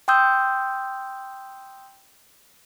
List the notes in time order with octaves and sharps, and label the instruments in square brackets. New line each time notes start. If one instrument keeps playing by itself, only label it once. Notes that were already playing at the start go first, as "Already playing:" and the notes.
[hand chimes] G5 C6 D#6 E6 G6